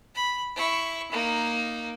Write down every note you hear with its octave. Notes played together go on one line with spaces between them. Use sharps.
B5
E4 C#6
A#3 D#4